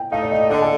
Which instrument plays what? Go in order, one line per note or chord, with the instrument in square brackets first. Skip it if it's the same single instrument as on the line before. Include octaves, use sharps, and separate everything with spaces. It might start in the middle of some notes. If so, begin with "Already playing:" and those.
Already playing: [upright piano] G5
[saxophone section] A3 D#4 [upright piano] F5
[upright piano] D5
D#5
D5
[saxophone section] D3 [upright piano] D#5
[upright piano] A4